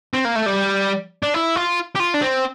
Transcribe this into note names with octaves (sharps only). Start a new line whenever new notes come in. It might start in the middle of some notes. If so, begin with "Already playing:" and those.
C4
A#3
A3
G3
D4
E4
F4
G4
F4
D4
C4